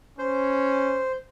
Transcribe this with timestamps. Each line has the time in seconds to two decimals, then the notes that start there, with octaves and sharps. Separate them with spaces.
0.19 C#4 C5